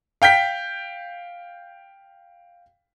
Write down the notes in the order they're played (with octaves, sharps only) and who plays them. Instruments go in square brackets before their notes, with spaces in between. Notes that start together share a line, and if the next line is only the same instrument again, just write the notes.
[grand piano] F5 G5 G6 B6